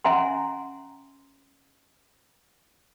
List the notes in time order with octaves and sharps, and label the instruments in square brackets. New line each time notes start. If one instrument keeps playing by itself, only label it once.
[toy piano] C#4 E5 F#5 G#5 A#5 C6